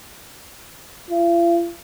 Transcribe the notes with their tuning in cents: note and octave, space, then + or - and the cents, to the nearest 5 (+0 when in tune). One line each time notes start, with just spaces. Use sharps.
F4 -45